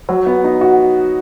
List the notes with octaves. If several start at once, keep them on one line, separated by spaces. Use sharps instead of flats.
F#3
B3
D#4
F#4